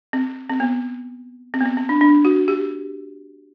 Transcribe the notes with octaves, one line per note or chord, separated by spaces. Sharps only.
C4
C4
B3
C4
B3
C4
C4
D4
D4
F#4
G4